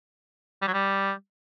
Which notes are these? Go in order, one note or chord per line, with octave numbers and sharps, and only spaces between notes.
G3
F#3
G3